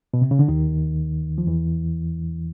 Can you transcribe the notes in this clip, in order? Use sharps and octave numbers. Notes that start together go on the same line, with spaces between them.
B2
C3
C#3
D3
D#2 D#3
F3
E2 E3